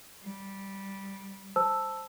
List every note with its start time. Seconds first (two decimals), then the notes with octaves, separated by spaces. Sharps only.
0.23 G3
1.56 C5 A5 E6